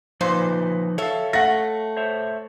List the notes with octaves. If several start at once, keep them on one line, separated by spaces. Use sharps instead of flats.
A#2 F3 D#4 B4 C5
A4 C#5 E5 F5
A3 F#5 A#6
C5 C#5 E5